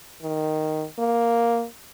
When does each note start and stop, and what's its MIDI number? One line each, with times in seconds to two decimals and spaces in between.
0.23 0.85 51
0.99 1.65 58